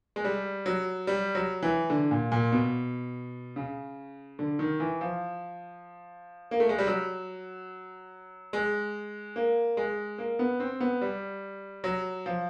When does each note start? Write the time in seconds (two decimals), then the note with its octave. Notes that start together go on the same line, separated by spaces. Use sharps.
0.16 G#3
0.24 G3
0.66 F#3
1.07 G3
1.35 F#3
1.62 E3
1.90 D3
2.11 A#2
2.32 A#2
2.52 B2
3.56 C#3
4.39 D3
4.59 D#3
4.80 E3
5.01 F3
6.51 A#3
6.60 A3
6.69 G#3
6.78 G3
6.87 F#3
8.53 G#3
9.36 A#3
9.77 G#3
10.18 A#3
10.39 B3
10.60 C4
10.80 B3
11.01 G3
11.84 F#3
12.26 F3